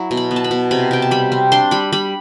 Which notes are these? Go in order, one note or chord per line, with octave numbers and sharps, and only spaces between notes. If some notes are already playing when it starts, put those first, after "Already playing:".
Already playing: F#3 E4
B2
B5
B3
A5
B5
B2
C3 B5
C3 G5
A5
G3 B5
C4
D4 C6
G3 B5
G3 B5